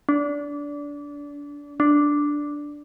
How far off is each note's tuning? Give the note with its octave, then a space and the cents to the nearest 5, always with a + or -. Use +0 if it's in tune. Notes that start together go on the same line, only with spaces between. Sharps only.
D4 -25
D4 +0